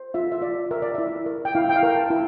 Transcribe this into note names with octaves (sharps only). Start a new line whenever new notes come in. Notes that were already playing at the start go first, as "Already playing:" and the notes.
Already playing: C5
F4 E5
E5
F4 D5
A#4 E5
D5
E4 E5
A#4
G5
E4 F5
G5
F5
A#4
A5
E4